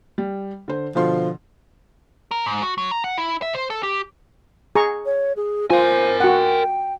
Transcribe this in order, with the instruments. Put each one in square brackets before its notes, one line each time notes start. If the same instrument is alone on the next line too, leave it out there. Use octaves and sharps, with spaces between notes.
[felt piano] G3
D3 C5
[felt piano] B2 D3 C6 [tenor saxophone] F3
[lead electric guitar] A#4
G#2
F#4
F#3
A#5
F#5
E4
E5
C5
A4
G4
[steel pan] G#4 A#5 C#6
[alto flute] C#5
G#4
[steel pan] F4 [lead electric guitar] A#4 G#5 [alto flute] C5
[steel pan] F#4 F#5 [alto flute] G5